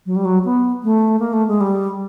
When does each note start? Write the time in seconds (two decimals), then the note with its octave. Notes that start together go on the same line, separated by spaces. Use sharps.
0.06 F#3
0.16 G3
0.25 F#3
0.45 B3
0.84 A3
1.19 A#3
1.33 A3
1.48 G#3
1.61 G3